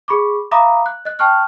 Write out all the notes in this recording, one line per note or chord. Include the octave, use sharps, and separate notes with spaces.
G#4 B5 C#6 D6
E5 F5 A#5 B5 D6 D#6
F#6
D#5 F#6
G5 A5 C#6 F6 F#6